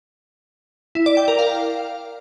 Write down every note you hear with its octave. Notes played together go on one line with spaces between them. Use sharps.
E4
D5
G5
A#4
F5